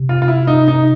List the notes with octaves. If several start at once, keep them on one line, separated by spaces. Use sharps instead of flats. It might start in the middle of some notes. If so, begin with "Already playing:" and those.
Already playing: C3
F4
F4
E4
D#4
D#4